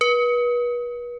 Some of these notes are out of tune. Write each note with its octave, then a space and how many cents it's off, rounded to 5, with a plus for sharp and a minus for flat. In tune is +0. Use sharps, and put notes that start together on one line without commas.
B4 -35